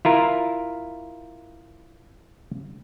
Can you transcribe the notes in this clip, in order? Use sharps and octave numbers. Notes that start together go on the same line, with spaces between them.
E4 F4 A#4